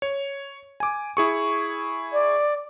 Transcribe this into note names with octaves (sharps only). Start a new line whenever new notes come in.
C#5
G#5 D6
E4 G#4 C#6
D5